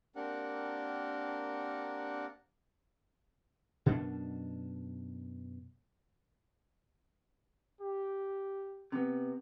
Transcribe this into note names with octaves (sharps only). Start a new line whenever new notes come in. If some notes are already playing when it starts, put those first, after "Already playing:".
A#3 C4 D4 G4 A#4 F#5
F#2 B2 D4
G4
C3 B3